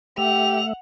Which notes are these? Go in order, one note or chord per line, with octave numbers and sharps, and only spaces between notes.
A3 G4 E5 F#5 F7